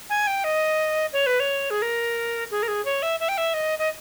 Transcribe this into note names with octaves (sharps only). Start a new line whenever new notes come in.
G#5
G5
D#5
C#5
B4
C#5
G#4
A#4
G#4
A#4
G#4
C#5
E5
E5
G5
E5
D#5
D#5